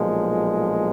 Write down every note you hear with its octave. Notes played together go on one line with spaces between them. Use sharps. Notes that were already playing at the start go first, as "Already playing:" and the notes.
Already playing: B1 A#2 F3 G#3